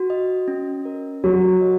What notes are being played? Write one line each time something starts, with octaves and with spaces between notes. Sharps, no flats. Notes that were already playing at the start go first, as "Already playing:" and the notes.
Already playing: F#4
D#5
C#4
A#4
F#3 F#4
D#5